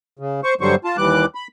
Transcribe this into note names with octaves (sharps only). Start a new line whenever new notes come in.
C#3
C5 C#6
G2 D3 F#3 G3 C5 C#6
F4 A5
D#2 E3 G3 D6 F#6
B5